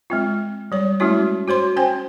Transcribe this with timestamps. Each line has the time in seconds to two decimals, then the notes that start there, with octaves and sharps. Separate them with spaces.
0.10 G#3 C4 F4
0.72 G3 C#5
1.00 G#3 A3 C#4 E4 F#4 C#5
1.48 F#4 C5 C#5 C6
1.76 C#4 C5 G5 G#5